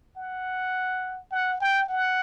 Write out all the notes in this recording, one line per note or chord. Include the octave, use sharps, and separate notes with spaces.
F#5
F#5
G5
F#5